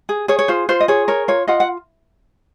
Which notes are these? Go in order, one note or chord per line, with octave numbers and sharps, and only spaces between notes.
G#4
G#4 C#5
C#5
F4 C5
F4 C5
D#5
G#4 C#5
A#4 C#5
F4 C#5
F4 D#5 F#5
F#5